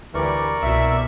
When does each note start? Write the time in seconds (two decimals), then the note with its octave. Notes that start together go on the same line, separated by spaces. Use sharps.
0.14 D2 E3 G3 A#4 D5 C#6
0.62 C2 B2 E5